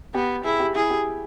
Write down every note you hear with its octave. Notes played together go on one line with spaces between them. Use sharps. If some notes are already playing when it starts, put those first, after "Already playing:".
B3 G4
E4 G#4
G4
E4 G#4
G4